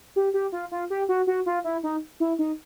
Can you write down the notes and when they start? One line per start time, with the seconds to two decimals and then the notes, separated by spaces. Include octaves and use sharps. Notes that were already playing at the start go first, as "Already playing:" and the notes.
0.16 G4
0.34 G4
0.52 F4
0.71 F4
0.90 G4
1.09 F#4
1.27 F#4
1.46 F4
1.64 E4
1.83 D#4
2.20 E4
2.39 D#4